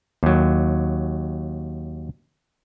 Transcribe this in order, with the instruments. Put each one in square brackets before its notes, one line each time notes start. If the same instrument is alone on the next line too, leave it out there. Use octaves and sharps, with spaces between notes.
[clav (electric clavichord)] D#2 F#3